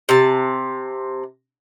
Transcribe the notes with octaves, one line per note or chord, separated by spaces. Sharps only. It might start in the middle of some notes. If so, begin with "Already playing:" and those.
C3 A5